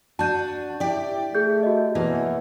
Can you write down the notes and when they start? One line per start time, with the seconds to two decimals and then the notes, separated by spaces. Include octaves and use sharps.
0.19 D4 F#4 A5 G6 D#7
0.80 E4 G4 D5
1.35 A3 G#4 G6
1.63 F#4 D#5
1.95 E2 B2 E3 A#3